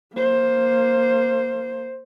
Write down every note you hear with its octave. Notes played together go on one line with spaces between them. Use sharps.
A#3 C5